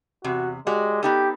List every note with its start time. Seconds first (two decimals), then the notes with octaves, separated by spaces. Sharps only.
0.24 E2 C3 F#4
0.67 G#3 F#4 G4 D5
1.03 B3 D#4 G4 A4